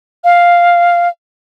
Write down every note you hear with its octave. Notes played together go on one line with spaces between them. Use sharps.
F5